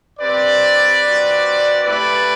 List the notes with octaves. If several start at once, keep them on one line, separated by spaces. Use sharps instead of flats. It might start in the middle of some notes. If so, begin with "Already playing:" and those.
C4 G4 B4 D5
C4 F#4
A3 E4 G4 B4 D5